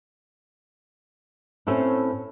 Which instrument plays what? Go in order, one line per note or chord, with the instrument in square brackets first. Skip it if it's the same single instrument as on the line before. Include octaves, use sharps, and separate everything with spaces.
[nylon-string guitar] A2 A3 C4 C#4 A4 G#5